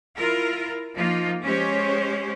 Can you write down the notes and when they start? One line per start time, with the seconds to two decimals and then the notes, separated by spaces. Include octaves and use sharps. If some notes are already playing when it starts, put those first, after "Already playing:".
0.16 E4 F4 A#4
0.95 F3 A#3 D#4 F4
1.43 G#3 C#4 G4 C5 C#5